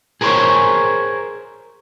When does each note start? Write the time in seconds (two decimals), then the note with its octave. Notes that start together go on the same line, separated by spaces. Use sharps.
0.21 G#4 A#4 C5 C#5